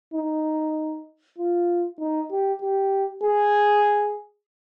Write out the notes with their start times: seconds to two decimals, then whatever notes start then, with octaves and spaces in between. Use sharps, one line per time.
0.14 D#4
1.38 F4
1.99 D#4
2.31 G4
2.62 G4
3.23 G#4